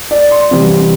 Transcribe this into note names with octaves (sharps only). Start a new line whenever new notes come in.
D5
C6
C3 E3 G3 E4